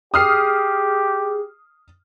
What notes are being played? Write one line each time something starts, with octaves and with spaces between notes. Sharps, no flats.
G4 G#4 D#6 F6 C7